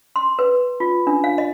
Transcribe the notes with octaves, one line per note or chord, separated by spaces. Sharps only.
C6
B4
F4
D4
F5
D#5